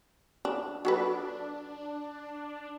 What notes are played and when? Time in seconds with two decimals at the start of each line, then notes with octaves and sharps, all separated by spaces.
0.45 D4
0.85 F#3 D4 A4 B4